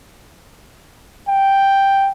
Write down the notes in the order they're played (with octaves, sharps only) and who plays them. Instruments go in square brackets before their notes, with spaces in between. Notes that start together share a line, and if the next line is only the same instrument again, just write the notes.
[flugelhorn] G5